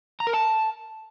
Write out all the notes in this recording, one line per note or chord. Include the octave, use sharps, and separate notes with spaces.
A#5
A#4
A5